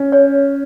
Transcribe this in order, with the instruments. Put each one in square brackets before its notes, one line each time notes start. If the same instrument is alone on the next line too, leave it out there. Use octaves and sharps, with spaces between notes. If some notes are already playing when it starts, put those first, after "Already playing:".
Already playing: [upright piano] C#4
[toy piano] C#5